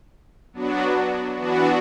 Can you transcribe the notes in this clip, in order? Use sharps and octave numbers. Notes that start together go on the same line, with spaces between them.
F#3 B3 D4 F#4
E3 B3 D4 F#4